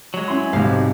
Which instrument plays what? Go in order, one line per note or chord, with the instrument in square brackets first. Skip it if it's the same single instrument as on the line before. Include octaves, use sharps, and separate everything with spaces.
[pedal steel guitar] F#3 G#3
[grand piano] C#4 E4 C6
[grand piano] B1 C3 [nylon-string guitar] G#2 G3 F5